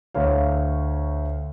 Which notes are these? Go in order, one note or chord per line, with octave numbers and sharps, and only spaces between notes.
D2 C#5 F5